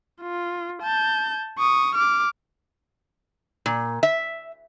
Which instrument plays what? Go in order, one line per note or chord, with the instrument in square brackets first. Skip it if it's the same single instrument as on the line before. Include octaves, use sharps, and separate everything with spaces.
[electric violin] F4
A5 G6
C#6 D#6
D6 F6
[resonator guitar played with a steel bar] A#2
E5